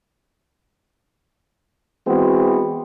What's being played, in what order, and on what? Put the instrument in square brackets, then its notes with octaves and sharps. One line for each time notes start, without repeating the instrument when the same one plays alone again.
[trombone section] E3 G#3 B3 C4 F#4